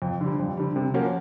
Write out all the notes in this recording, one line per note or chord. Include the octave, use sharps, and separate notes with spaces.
F2
D3 G3
F2
D3 G3
C3
F3 A#3 C#4 F#4